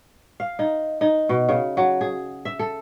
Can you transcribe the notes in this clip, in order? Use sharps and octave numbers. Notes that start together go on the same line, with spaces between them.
F5
D#4
D#4
B2
C#3
F#3
G#4
E5
A4